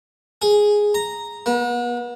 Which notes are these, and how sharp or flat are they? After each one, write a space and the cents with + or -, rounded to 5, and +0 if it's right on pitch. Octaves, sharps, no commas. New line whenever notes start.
G#4 +0
A#5 -5
B3 -40